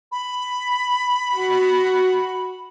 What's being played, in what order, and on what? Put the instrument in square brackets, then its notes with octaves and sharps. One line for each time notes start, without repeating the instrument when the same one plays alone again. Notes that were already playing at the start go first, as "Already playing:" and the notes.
[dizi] B5
[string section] F#4